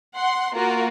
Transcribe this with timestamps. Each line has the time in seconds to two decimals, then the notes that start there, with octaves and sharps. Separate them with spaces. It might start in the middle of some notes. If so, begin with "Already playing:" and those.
0.15 F#5 C6
0.55 A#3 F4 F#4 A#4